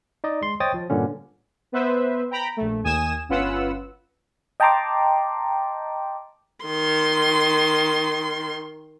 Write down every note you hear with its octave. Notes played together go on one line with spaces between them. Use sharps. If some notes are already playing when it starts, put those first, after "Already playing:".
D#4 D5 D#5
G#3 C6
C5 C#5 D#5 G5 D#6 A6
F3
G2 A#2 D3 C#4
B3 B4 C5 E5
G5 A#5 B5
A#1 A3
D#2 G#5 D#6 E7
G1 C#4 F4 B4 F#5 E6
D#5 G5 A5 A#5 C6 D6
D#3 C6